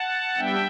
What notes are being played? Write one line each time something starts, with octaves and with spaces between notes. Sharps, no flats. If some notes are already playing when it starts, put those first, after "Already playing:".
Already playing: F#5 A5
G3 B3 D4 E5 G5